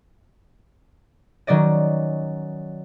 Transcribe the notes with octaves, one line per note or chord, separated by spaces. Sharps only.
D#3 F#3 C#4 D5 D#5